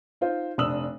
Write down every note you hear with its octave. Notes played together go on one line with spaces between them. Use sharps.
D#4 F4 C5
F1 D4 D#6 E6 F#7